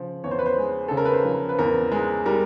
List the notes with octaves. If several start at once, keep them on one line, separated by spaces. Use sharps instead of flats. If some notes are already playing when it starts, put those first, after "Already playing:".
Already playing: C#3 F3
E2 C#5
C5
B4
C5
G#3
C#3 A4
A#4
B4
C5
F3
B4
E2 A#4
G#3
G3 A#4